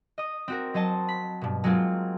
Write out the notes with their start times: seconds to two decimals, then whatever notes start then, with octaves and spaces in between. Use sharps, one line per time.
0.18 D#5 D#6
0.48 C4 F#4 A#4
0.74 F#3 C5 D#5 A5
1.08 B5
1.41 G2 B2
1.64 F#3 G#3 A#3 C4 F4